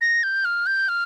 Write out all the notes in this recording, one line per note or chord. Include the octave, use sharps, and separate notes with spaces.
A#6
G6
F6
G6
F6